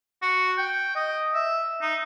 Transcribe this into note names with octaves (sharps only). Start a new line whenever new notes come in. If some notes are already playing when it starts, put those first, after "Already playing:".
F#4
G5
D#5
E5
D#4